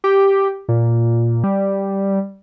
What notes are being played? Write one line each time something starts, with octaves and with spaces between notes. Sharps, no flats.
G4
A#2
G3